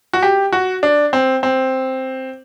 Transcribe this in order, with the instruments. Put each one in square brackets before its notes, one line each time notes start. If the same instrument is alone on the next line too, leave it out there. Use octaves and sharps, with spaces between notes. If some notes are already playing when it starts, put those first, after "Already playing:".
[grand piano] F#4
G4
F#4
D4
C4
C4